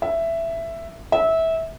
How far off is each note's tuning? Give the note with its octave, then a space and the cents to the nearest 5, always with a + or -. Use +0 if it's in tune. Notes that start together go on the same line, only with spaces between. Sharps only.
E5 +10
E5 -20